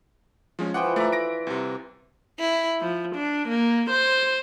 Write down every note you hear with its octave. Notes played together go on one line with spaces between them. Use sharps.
F3 G#3 C#4
E3 F3 F#5 G5
A3 D5 E5 A#5
A#6 D7
C2 C3
E4
F3
D4
A#3
C5